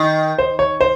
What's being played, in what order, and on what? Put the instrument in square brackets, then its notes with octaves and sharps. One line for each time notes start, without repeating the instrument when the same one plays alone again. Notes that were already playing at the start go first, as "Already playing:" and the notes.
Already playing: [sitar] D#3
[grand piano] C5
C#5
C5